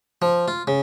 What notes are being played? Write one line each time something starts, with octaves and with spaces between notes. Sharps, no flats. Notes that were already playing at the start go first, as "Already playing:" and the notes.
F3
F4
C#3